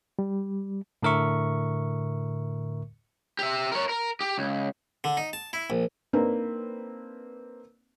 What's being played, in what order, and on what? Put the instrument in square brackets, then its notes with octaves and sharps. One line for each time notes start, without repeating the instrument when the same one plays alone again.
[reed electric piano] G3
[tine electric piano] A2 D3 A#4 E5 C#6
[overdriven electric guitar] G4 E5
A#4 C#5
A#4
G4
C#2
[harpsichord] D3
D#4
A5
E4
A#1
[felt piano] A#3 C4 D4 D#4 B4